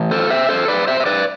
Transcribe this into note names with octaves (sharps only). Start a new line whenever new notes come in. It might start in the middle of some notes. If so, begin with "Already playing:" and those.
Already playing: A2 E3
A4 C5
C5 E5
A4 C5
B4 D5
C5 E5
E5
B4 D5